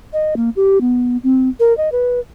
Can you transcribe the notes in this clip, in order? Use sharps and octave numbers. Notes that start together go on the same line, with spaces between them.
D#5
A#3
G4
B3
C4
A#4
D#5
B4